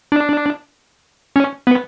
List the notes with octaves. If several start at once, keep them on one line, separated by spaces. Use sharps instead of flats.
D4
C#4
B3